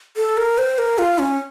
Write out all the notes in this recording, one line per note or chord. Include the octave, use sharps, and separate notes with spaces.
A4
A#4
C5
A#4
F4
C#4